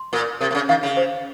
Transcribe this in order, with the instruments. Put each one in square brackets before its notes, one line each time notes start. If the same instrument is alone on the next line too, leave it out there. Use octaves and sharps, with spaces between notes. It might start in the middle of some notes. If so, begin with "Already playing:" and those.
Already playing: [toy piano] C6
[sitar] A#2 [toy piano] A#4
[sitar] C3 [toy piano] A#4
[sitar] C3
C#3
[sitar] D#3 [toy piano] F5
[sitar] C#3
[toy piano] C5